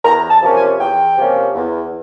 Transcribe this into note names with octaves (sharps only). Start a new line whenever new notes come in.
E2 A#5
A5
C3 F3 A#3 C#4
G#5
E2 G5
C3 F3 A#3 C#4
E2